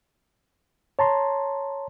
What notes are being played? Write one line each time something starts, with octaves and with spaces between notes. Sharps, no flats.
C#5 A5 A#5 C6